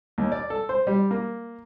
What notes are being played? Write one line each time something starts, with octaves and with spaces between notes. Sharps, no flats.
D#2
D5
A4
C5
G3
A#3